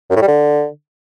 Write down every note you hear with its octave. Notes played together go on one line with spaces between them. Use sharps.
F#2
A2
G3
D3